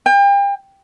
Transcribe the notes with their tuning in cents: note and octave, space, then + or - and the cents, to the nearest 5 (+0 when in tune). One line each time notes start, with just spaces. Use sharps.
G5 +35